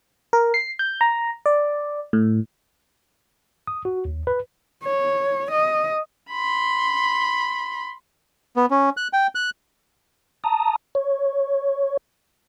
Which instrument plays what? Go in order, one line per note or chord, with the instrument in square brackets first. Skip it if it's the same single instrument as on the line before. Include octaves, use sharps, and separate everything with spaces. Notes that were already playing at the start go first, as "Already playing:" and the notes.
[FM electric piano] A#4
C7
G6
A#5
D5
A2
[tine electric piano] D#6
F#4
D#2
B4
[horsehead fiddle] C#5
D#5
[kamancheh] B5 C6
[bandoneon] B3
C#4
F#6
G5
F#6
[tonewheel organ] A5 A#5 D#6
C#5